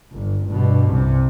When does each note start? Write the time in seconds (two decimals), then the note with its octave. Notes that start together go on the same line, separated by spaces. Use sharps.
0.13 G1
0.47 G2 B2
0.89 C2 C3